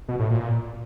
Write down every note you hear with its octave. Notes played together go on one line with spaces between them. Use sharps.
B2
A2
A#2